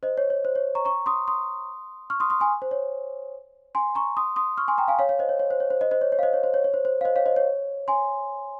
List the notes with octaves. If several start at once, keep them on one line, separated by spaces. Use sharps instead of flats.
C5 D#5
C#5
C#5
C5
C#5
A#5 C#6
A#5 C#6
C6 D#6
C6 D#6
C#6 F6
C6 D#6
C6 D#6
G#5 C6
C5
C#5
G#5 C6
A#5 C#6
C6 D#6
C6 D#6
C#6 F6
G#5 C6
G5 A#5
F5 G#5
C#5 F5
C#5 F5
C5 D#5
C#5
C#5
C5
C#5
C5
C5 D#5
C5 D#5
C#5
C#5
F5
C5 D#5
C#5
C5
C#5
C#5
C5
C5
F5
C5 D#5
C#5 F5
C5 D#5
C#5
G#5 C6